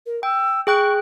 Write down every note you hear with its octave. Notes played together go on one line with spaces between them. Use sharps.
A#4
G5 E6
G#4 G5 C#6 F#6